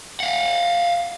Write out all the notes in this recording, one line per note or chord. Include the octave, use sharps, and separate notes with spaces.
F5 F#5